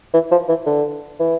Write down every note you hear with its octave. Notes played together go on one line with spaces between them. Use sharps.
E3
F3
E3
D3
E3